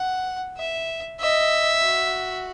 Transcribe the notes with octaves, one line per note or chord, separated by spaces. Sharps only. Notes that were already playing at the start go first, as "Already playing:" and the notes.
Already playing: F#5
E5
D#5 E5
F#4